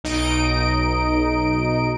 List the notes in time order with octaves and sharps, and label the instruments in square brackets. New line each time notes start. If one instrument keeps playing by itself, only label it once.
[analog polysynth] B1 D#4 D#5 D7